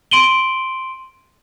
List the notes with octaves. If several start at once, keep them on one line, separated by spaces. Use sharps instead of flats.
C6 D7 D#7 F#7 G7